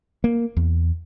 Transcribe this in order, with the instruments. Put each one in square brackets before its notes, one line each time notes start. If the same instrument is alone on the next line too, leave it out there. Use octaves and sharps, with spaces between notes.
[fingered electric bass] A#3
E2